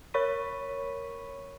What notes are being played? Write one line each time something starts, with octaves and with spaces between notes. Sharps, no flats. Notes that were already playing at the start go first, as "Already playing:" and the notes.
A#4 C#5 B5 C#6 B6 D#7